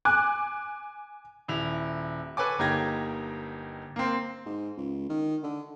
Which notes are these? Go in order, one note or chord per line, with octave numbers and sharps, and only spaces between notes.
G#5 D6 F#6
D#1 E4 F7
A4 B4 C#5 G#5 D6
G1 A#3 D#4 G4 G#6 A#6
A#3 C4
G#2
C#2
D#3
D3